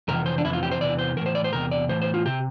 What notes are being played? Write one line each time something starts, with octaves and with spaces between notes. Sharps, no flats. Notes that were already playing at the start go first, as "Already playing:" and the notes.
F2 C3 E3 A#4
C5
D4
F2 C3 E3 E4
F4
G4
C5
E2 C3 E3 D5
C5
A2 E3 A#4
C5
D5
C5
E2 C3 A#4
D5
A2 E3 C5
C5
F4
C3 G4